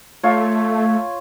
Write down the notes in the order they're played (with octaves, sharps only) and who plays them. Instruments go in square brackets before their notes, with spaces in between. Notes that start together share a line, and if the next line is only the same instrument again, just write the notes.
[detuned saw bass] A3 [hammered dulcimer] F4 C#5